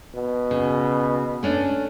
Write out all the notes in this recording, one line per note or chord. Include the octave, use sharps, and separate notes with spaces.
B2
C#3
A3 C#4 D4